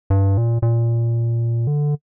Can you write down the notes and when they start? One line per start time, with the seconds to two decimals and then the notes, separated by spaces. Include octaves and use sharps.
0.10 G2
0.37 A#2
0.62 A#2
1.67 D3